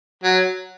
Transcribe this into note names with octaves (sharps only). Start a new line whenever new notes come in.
F#3